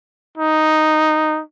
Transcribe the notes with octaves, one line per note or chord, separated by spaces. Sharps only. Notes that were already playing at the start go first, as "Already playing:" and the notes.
D#4